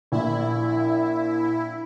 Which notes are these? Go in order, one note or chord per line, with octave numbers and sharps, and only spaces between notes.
A#1 A#2 E4